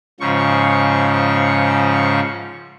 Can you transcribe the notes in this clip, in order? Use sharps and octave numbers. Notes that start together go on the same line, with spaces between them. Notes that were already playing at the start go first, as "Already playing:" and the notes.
G#2 C#3 F3 C#6